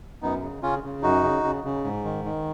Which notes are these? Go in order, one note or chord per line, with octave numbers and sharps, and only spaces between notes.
F#2 B3 D#4
C#3
C#3 C#4 F4
C#3
F#2 D#4 F#4
C#3
C#3
C#3
G#2
D#3
D#3